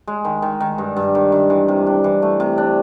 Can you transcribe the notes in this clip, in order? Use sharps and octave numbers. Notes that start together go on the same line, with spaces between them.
G#3
D#3
D#3
D#3
G2
G2
D#3
D#3
E3
C3
D4
E3
A3
C3
D4